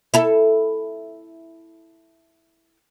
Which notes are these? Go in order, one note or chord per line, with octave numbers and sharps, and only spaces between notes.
E4 A4